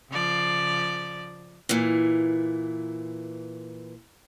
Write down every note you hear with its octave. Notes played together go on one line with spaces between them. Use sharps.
C#3 F3 D5
A#2 E3